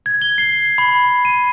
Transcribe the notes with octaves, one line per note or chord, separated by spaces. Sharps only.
G#6
G7
C7
B5
D#7